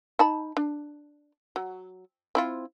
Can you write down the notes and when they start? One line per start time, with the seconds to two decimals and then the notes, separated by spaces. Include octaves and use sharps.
0.19 D#4 A5 B5
0.57 D4
1.56 F#3
2.35 C4 E4 F4